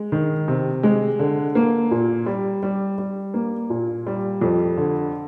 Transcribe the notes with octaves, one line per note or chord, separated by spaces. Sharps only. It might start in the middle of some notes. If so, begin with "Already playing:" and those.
Already playing: G#3
D#3
C3
G#3
D3
A#3
A#2
G3
G3
G3
A#3
A#2
G3
F2
D3